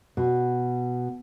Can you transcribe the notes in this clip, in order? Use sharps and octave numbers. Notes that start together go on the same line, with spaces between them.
B2